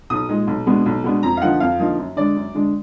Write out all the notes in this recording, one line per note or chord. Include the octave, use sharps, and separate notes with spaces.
B1 D#6
A#2 G#3 D#4
B1
B2 G#3 B3 D4
B1
B2 G#3 B3 D4
F2 A#5
F5
D3 F3 A#3 D#4 F#5
F2 F5
D3 F3 A#3 D#4
F#2
D3 G#3 D4 D5
F#2
D3 G#3 D4